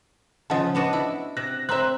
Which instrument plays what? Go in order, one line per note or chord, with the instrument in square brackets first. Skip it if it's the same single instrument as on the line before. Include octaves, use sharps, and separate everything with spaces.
[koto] C#3 F3 [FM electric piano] D#5 F#5 A5
[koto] B3 D4 F#4
E4
[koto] C3 [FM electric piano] F#6 A#6
[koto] C4 E5 [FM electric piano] C5 A#5 F#6